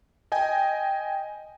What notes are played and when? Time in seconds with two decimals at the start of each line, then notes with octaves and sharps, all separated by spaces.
0.32 D#5 G5 G#5